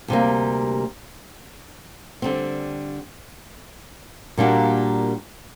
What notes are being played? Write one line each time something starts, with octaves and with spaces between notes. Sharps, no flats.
D2 C3 G3 A#3
D3 G3 C4
A#2 G3 A#3 D4 F#4